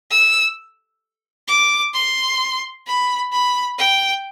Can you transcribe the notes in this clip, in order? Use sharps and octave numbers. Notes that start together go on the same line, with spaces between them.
E6
D6
C6
B5
B5
G5